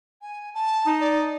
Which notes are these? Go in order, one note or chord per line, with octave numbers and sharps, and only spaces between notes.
G#5
A5
D#4
D5